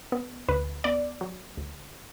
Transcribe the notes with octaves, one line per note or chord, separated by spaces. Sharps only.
B3
D2 B4
B3 D5
F#3
D2